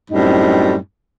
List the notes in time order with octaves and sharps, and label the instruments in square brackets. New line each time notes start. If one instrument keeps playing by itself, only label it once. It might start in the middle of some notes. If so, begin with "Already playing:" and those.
[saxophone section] F#2 A2 G3 C4 D#4